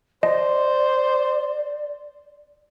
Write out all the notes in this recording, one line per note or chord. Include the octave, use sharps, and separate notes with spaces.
C5 D5 D#5